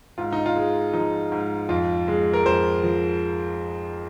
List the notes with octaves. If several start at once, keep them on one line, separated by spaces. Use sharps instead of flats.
G#2 F4
D#4
F4
G#3
F3 D#4
G#2
F2 F4
G#3
A#4
F2 C5
F3